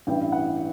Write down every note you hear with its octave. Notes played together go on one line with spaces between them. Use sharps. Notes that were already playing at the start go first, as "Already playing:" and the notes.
A1 G2 E3 G5
F#5